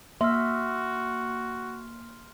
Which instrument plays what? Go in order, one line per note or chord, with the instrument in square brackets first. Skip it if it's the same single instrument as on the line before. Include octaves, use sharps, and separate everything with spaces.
[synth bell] A#3 [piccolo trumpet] F#4 [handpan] E5 [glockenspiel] C6 F6